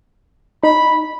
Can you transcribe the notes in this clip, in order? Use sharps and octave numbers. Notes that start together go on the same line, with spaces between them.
D#4 B5